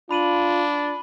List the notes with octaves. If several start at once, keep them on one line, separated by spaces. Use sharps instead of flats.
D4 F4 B5 D#7 F#7